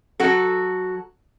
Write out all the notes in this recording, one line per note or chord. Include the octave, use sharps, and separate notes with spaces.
F#3 F#4 A4